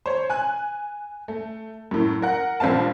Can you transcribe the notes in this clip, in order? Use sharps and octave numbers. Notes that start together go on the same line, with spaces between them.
C5 C#5
G#5 F#6
A3
F#2 A2
A#4 F#5
A#1 G2 C4 F5 A5